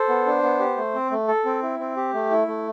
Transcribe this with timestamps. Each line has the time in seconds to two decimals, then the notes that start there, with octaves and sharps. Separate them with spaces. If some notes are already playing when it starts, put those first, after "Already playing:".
Already playing: A4 C5
0.09 B3
0.26 D4
0.43 B3
0.59 G4
0.77 A3
0.94 C4
1.11 A3
1.28 A4
1.45 C4
1.62 E4
1.79 C4
1.96 G4
2.14 A3
2.31 E4
2.47 A3